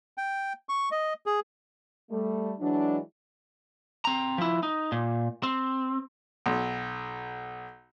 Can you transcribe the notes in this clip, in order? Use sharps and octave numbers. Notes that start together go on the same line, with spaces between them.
G5
C#6
D#5
G#4
G3 A3
E3 F#3 G#3 D4
C4 A#5
F3 E4
D#4
A#2
C4
B1